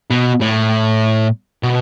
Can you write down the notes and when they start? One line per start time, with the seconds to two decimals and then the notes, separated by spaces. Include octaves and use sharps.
0.11 B2
0.41 A2
1.63 B2